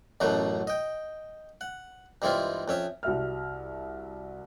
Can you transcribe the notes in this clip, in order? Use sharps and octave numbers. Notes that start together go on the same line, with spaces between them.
A1 F#2 B2 F#3 A3 F#5
D#5 G5
F#5
G2 E3 G#3 C4 E4 F4
F2 C#4 E5
C2 F#4 E5 F6